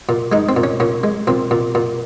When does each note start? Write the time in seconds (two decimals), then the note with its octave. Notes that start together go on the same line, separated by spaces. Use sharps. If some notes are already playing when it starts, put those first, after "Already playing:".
0.09 A#2
0.32 G#3 D#4
0.49 C4
0.56 A#2
0.64 C#4
0.80 A#2 C#4
1.04 G#3
1.27 A#2 C4
1.51 A#2
1.75 A#2